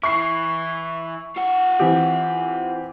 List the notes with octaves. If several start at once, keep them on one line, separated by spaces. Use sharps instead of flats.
E3 E4 C#6 C7
F4 F#5
E3 C4 G4